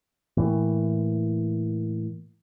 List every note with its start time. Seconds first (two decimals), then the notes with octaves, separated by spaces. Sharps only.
0.37 A2 E3 A#3